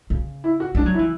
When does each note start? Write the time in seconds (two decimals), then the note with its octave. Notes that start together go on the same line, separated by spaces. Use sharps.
0.10 C#3
0.44 E4
0.60 F#4
0.75 G#3 D4
0.86 F#3
0.94 E4
0.99 E3